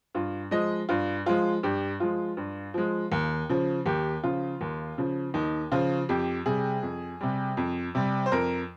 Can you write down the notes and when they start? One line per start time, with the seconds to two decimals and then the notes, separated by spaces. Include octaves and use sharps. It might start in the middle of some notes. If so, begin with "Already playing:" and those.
0.14 G2 F4
0.51 F3 G#3 D#5
0.89 G2 F4
1.26 F3 G#3 F4
1.63 G2 G4
2.00 F3 G#3 F4
2.37 G2
2.74 F3 G#3
3.12 D#2
3.49 C#3 F3
3.86 D#2 G4
4.23 C#3 F3 F4
4.61 D#2
4.98 C#3 F3
5.34 D#2 D#4
5.72 C#3 F3 F4
6.09 F2 G4
6.46 C3 G3 G#4
6.83 F2
7.21 C3 G3
7.57 F2
7.95 C3 G3
8.26 C5
8.32 F2 A#4